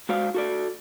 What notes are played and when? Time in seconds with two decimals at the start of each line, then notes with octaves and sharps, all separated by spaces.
0.09 G#3 F#4 C5 D5 F5
0.34 F#4 A4 D5